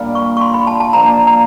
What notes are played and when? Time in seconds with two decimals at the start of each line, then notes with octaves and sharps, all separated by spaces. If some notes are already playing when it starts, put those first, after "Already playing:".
Already playing: A#2 G3 A#3 D4
0.15 C#6
0.37 C#6
0.41 C6
0.54 B5
0.67 A5
0.80 A5
0.93 F3 A#3 D4 A#5
1.27 A#5